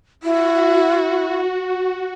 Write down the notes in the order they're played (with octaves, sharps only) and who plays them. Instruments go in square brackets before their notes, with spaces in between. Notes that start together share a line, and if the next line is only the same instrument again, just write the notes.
[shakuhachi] E4 [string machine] F#4